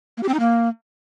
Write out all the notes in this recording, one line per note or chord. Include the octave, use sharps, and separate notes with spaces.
A#3
G4
C4
D#4
A#3